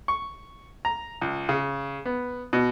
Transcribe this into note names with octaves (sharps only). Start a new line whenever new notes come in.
C#6
A#5
C#2
C#3
B3
B2